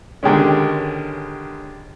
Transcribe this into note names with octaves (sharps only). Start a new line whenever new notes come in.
D3 D#3 G3 G#3 C#4